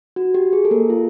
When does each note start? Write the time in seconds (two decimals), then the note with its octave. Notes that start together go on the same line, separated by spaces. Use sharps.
0.16 F#4
0.35 G4
0.53 G#4
0.65 A4
0.71 A#3 A#4
0.90 F4